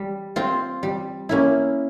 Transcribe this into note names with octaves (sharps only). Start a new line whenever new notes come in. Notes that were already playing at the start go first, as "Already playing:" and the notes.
Already playing: G3
C4 F4 C5
G3
A#3 C#4 E4